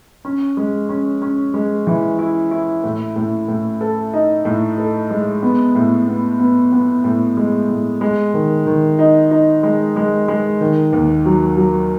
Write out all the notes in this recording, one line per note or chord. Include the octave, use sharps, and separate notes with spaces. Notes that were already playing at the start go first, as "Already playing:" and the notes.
C#4
G#3
C#4
C#4
G#3
E3
E4
E4
A2
A2
A2
A4
D#4
A2
A4
G#3
B3
A2
B3
B3
B3
A2
G#3
A2
G#3
D#3
D#3
D#4
D#4
G#3
G#3
G#3
D#3
D#2
F#3
F#3